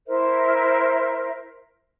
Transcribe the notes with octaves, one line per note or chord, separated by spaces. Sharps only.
E4 A#4 C5 E5